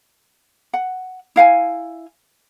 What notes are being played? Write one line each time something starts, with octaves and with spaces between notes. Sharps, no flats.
F#5
E4 F5 F#5 G#5